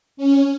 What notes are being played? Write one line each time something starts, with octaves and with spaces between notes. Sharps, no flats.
C#4